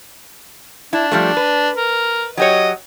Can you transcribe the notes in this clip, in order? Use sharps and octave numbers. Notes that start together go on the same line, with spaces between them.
D4 E4
F3 G3 A3
B4
A#4
F#3 G4 C#5 D#5